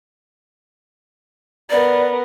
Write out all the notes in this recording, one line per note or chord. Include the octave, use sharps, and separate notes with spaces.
B3 A#4 D5